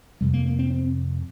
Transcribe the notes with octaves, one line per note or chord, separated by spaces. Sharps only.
F2 C3 G3
A#3
A#3
C4
C4